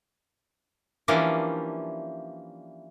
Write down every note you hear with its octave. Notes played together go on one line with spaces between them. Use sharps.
E3 F3 G3 A#3 C#4 D4